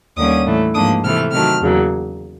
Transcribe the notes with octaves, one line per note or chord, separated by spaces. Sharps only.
D#2 D3 G3 A#3 C#4 D#6
A2 E3 A3
G#2 F3 A#3 D4 D#6
C3 E3 A3 F6
C3 D#3 F#3 A3 F6
E2 C#3 F#3 A#3